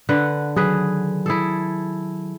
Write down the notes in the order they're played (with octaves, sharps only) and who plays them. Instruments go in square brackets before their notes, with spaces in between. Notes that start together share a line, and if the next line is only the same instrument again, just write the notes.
[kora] D3 B4 F#5
[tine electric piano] D#3 F#3 [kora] G#4 B4
[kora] E4 G#4 A4